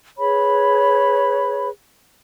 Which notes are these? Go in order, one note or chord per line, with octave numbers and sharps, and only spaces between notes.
G#4 B4 C#5 B5